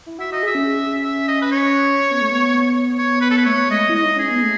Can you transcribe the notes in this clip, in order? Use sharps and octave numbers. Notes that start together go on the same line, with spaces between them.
E4
F#4 E5
F#4 D#5
G#4 E5
C#4
E5
D#5
B4
C#5
C#4
B3
A3
B3
C#5
B4
A4
B4
A3 C#5
G#3 D#5
E4
D#5
D#4
C#4 G#4
B3
A3